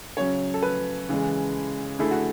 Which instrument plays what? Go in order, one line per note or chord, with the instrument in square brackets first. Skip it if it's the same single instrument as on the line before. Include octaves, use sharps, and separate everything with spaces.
[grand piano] C#3 F#3 C#4 [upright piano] C#5
[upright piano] A4
B4
[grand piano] C#3 E3 G#3
[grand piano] D3 A3 E4 A4 [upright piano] G#4
[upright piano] F#4